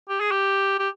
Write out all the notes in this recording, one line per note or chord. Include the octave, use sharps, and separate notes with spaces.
G4
G#4
G4
G4